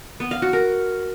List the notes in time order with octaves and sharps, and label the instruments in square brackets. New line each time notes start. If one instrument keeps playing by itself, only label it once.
[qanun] B3
F5
F#4
A#4